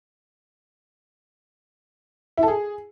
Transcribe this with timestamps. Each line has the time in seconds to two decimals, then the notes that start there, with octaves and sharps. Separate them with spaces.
2.37 E4
2.43 A4
2.48 G#4